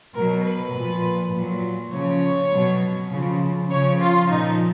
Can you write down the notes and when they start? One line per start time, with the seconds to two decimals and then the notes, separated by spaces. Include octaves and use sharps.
0.15 B2 F#3 A#4
0.45 B4
0.74 A#2 F3
1.33 A#2 F#3
1.93 C#3 F3 C#5
2.52 B2 F#3
3.11 C#3 F3
3.70 C#3 F3 C#5
4.00 F4
4.30 A#2 F3 D#4